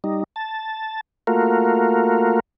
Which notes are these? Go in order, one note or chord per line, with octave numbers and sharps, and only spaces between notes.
G3 D#4
A5
A3 A#3 F4 F#4 A#4